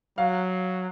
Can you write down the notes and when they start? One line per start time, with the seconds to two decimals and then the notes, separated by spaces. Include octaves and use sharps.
0.18 F#3 F5